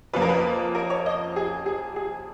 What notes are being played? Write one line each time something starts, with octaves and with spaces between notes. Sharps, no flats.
F2 F3 A#3 C#4 F4 B4
A#4
B4
A#4
C#5
D#5
G#4
G#4
G#4